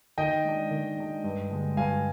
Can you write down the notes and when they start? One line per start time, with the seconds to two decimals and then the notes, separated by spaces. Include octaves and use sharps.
0.18 D#3 D#5 G5
0.44 G#3 D4
0.71 D#3
0.97 G#3 D4
1.24 G2
1.50 D3 G#3
1.77 G2 F5 G#5